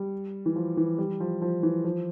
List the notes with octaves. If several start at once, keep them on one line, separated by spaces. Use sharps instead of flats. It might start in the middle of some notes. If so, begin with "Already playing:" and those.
Already playing: G3
E3
F3
E3
G3
F3
F3
E3
F3